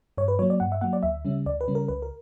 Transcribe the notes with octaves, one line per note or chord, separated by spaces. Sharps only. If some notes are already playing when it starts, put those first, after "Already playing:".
G2 C#5
B4
F#3 A#3 C#5
D5
G2 F#5
E5
F#3 A#3 F#5
D5
D2 E5
C#3 G3 C#4
D2 D5
B4
C#3 G3 C#4
A#4
C#2 B4
A#4